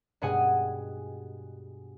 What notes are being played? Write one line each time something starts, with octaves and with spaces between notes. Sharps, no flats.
G2 B2 G#3 F#5 G#5 D#6